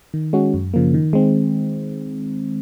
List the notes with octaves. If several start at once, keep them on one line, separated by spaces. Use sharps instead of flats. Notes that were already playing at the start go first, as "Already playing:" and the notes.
D#3
G#3 C#4 F#4
F#2
C#3 F3 A#3
D#3
G#3 C4